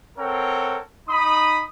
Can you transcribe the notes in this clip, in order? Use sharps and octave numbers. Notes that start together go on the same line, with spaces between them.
C4 A4 A#4 C#5 F#5 G5
D#4 B5 D#6